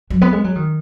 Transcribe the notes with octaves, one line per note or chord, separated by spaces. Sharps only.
F#3
B3
G#3
F#3
D#3